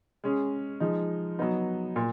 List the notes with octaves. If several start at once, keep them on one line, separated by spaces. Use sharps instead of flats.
G#3 C#4 G#4
F3 G#3 D#4
F#3 B3 D#4
A#2